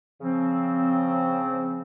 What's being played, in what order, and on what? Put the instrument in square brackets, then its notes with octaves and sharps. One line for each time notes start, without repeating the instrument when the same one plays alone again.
[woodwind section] C#3 F3 C4